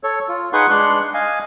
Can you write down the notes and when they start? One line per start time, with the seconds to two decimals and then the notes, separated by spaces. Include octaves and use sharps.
0.04 A4 C#5
0.29 F4
0.53 D#4 G#4 B4 F#5 C6 C#6
0.70 G#3 D4 C6 F#6
1.14 D#5 F5 G#5